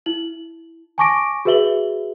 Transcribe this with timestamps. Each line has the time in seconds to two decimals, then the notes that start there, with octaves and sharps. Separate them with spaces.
0.06 E4 F#7
0.98 G#5 A5 C#6 D6 A#6 D7
1.45 F#4 G#4 B4 E5 F#7 G7